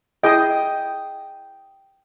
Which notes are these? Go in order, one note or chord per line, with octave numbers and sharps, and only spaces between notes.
E4 G#4 D#5 G5 D#6